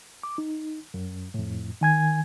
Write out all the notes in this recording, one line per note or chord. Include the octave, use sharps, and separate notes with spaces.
D6
D#4
F#2
F2 A2
D#3 G#5 G#6